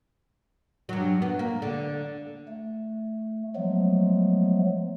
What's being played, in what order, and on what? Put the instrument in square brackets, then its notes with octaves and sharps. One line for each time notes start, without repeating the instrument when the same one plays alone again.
[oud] G2 F#3
B3
A#3
D3
[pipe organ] A3
F3 F#3 G#3 A3 B3